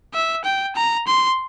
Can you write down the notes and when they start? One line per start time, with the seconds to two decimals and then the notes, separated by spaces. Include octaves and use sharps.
0.14 E5
0.45 G5
0.76 A#5
1.07 C6